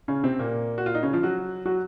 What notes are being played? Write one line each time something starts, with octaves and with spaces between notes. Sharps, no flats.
C#3 C#4
C3 C4
A#2 A#3
F#4
F4
D#4
C#3 C#4
F3 F4
F#3 F#4
F#3 F#4